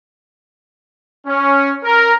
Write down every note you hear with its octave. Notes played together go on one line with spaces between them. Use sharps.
C#4
A#4